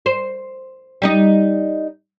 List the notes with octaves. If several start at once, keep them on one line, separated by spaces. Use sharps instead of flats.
C5
G3 D#4 D#5